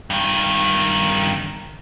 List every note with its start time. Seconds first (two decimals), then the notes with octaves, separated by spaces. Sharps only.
0.10 G2 D#3